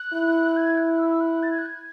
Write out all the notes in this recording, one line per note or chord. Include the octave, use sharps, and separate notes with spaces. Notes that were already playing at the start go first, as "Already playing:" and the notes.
Already playing: F#6
E4
G#6
F#6
E6
E6
F#6
A6
G#6
F#6
G#6